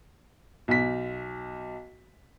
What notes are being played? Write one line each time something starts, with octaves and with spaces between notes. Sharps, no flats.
B1 B6